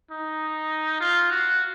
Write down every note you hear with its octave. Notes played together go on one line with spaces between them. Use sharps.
D#4
F4
F#4